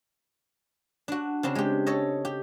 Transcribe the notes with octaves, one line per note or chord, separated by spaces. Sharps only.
D4 F#4
C#3 C4 D4
G#3 G4
A4 C#5 D#5
G4